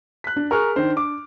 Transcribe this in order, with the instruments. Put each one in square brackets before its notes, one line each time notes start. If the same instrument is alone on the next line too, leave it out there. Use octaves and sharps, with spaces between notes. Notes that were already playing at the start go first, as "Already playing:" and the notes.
[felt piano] F#6 B6
D4
[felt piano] G#4 F#6 [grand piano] A#4 C#6 F6
[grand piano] D#3 C5 [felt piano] D4
[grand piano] D6